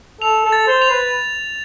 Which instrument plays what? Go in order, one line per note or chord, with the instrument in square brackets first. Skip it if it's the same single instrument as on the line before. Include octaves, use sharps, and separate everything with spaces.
[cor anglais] A4 [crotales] F7
[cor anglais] A4
[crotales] A6
[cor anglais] C5
[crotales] F7
[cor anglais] B4